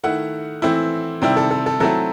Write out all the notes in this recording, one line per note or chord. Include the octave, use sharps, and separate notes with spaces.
D#3 A3 E4 F#5
E3 A3 C4 E4
C3 D#3 G3 C4 E4 G5
A4
A4
A4
F#3 A3 C4 E4 A4